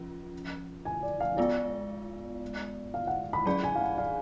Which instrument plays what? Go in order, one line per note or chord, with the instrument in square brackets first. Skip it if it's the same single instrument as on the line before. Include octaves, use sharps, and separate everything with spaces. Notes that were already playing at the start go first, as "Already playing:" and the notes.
Already playing: [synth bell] F3 C#4 F4
[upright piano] G#5
D5
F5
[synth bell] G#3 B3 F4 [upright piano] D5
[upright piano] F5
F#5
B5
[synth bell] F#3 C#4 G#4 D5 [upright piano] B5
[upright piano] G#5
F5
F#5
F5